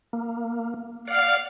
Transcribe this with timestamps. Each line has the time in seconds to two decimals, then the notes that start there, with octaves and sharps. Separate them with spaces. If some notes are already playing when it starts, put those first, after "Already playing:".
0.13 A#3
1.07 D5 F5 F#5